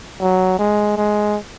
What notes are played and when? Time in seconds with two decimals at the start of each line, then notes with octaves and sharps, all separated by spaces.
0.20 F#3
0.59 G#3
0.97 G#3